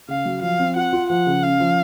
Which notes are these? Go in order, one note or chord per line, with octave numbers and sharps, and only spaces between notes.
C#3 F5
F#3
F3 F5
C4
F4 F#5
F4
F3 F#5
C#3
C#4 F5
F3